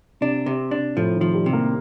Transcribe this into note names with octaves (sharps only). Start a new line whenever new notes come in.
C3 D4
C3
D4
A2 F3
D#3
F3
G3
C3
A#3